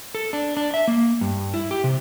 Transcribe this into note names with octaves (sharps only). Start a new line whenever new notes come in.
A4
D4
D4
E5
A#3
G2
E4
G4
C3